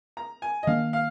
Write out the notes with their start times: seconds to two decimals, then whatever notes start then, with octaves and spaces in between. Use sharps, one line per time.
0.17 A#5
0.42 G#5
0.63 D#5
0.67 D#3 A#3 D4 F5
0.93 F5